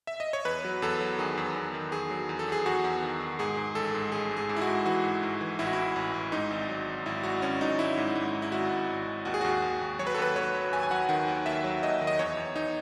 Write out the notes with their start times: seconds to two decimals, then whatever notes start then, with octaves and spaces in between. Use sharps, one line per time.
0.07 E5
0.20 D#5
0.33 C#5
0.45 E2 B4
0.64 F#3
0.82 E2 A4
1.01 F#3
1.18 D#3 G#4
1.37 E2
1.56 E2
1.74 D#3
1.92 E2 G#4
2.11 F#3
2.29 E2
2.39 A4
2.48 E2 G#4
2.66 E2 F#4
2.84 E2
3.02 D#3
3.21 D#3
3.39 G#2 G#4
3.57 G#2
3.75 A1 A4
3.94 G#2
4.12 A1 G#4
4.31 G#2
4.37 G#4
4.49 G#2
4.56 E4
4.62 F#4
4.67 G#2
4.85 E3 F#4
5.04 G#2
5.22 G#2
5.41 E3
5.59 A1 E4
5.67 F#4
5.73 A1 E4
5.96 A1
6.14 A1
6.32 G#2 D#4
6.51 G#1
6.69 F#3
6.87 G#1
7.06 G#1 E4
7.23 G#1 F#4
7.42 G#1 C#4
7.61 F#3 D#4
7.79 G#1 E4
7.97 G#2
8.15 G#2
8.35 G#2
8.42 E4
8.52 G#1 F#4
8.70 G#1
8.89 G#1
9.07 G#1
9.25 D#2 F#4
9.34 G#4
9.41 D#2 F#4
9.62 D#2
9.81 D#2
9.99 F#3 C#5
10.07 B4
10.15 A4
10.18 D#2 B4
10.36 D#2 C#5
10.54 F#3
10.73 D#2 G#5
10.83 G#5
10.91 F#3 F#5
11.09 D#3 F#5
11.28 D#2
11.46 D#2 E5
11.64 F#3
11.83 D#2 D#5
12.01 D#3
12.07 D#5
12.19 E2 C#5
12.37 E2
12.55 E2 D#4